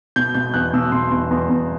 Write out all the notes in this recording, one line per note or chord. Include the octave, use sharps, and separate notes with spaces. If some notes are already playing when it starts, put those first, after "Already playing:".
B2 G6
B2 G6
E2 F#6
B2 E6
B2 C6
E2
E2
E2